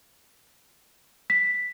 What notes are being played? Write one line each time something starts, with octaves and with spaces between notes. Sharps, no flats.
B6